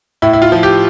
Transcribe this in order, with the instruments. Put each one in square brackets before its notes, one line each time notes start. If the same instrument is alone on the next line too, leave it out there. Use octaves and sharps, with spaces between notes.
[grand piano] A2 E4
E4
F4
F3
G4